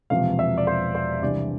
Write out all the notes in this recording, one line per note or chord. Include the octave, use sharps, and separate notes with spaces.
E1 E2 C3 F3 F5
E5
D5
C5
C5
C2 C3 E3 G3 D4 D5